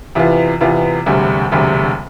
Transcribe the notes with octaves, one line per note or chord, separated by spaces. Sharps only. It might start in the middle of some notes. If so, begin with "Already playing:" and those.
E2 C3 E3 B3 F4
E2 C3 E3 B3 F4
E1 D2 C3 G3
E1 D2 C3 G3